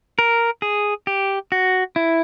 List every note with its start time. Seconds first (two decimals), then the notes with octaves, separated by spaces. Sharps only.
0.19 A#4
0.62 G#4
1.07 G4
1.52 F#4
1.96 E4